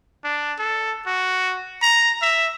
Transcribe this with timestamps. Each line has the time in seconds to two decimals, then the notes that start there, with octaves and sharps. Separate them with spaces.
0.24 D4
0.59 A4
1.07 F#4
1.82 A#5
2.22 E5